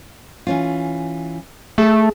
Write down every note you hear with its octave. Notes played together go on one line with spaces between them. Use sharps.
E3 C#4 F4
A3 G#4 A5